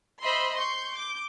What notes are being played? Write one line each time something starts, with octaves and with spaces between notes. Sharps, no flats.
C5 D#5 E5 B5 C6
C6 C#6 G6
D6 G6